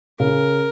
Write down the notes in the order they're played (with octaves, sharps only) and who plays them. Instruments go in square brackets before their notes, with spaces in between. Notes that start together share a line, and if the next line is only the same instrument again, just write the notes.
[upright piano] C#3 [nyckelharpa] A#4